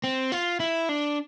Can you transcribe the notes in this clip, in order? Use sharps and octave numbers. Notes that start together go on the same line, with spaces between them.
C4
F4
E4
D4